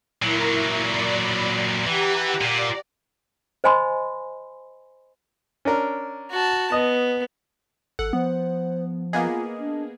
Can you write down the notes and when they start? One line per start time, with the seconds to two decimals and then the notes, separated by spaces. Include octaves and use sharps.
0.22 A#2 F#3 E4 A#4
0.79 D5 B5
1.86 E3 G4 F#5 A#5
2.41 A#2 D5
3.64 C5 D#5 G#5 B5 C6
5.65 C#4 D4 A#4
6.31 F#4 A5
6.72 B3 D#5
7.99 G#1 A4 F#5
8.13 F3 B3 C5
9.13 A#3 B3 F4 G#4 D#5
9.59 D4